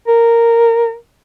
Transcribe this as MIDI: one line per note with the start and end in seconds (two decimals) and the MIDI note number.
0.08 0.95 70